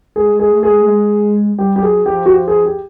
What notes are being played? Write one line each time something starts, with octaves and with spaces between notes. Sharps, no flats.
G#3 G#4
G#3
G#4
A3
G#4
G#3
A3
G#3
G3 G4
G4
F#3 G#4
F3 G4
F#4
F3 G4
G#4
G4